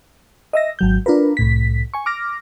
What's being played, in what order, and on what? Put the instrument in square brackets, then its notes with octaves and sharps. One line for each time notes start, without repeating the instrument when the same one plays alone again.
[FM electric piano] D#5 E5 A#6
G#1 F#3 G6
D4 F4 A#4 B4
C2 A2 B6
G#5 C#6
D6 F6 A#6